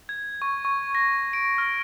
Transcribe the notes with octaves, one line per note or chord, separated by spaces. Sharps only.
G#6
C#6
C#6
A#6
D7
F6